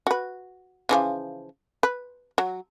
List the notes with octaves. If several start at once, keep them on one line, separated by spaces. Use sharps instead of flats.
F#4 B4
C#3 E3 F3
B4
F#3